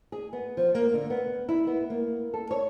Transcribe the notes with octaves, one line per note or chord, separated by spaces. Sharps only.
G#4
B3
F3
A#3
D3
B3
E4
B3
A#3
A4
C#5